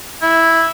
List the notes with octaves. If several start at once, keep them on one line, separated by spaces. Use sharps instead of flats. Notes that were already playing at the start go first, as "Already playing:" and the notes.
E4